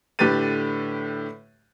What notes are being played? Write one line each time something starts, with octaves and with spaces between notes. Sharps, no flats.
A2 D3 G4 B4 A6 D#7